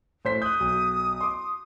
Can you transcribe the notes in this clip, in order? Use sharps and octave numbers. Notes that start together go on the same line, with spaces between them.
A2 C5 B6
D#6 F#6 G6
B1
C6 D6